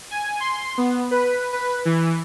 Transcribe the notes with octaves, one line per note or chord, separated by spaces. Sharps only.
G#5
C6
B3
B4
B4
E3